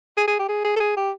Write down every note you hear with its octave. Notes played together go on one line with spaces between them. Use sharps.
G#4
G#4
G4
G#4
G#4
A4
G#4
G4